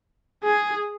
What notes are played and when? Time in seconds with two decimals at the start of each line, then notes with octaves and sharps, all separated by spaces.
0.43 G#4